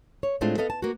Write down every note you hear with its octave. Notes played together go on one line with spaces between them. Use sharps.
C#5
A2 G#3 A3 C4 D4 F4
B3 A4 D#5 F5
A5
A#3 F#4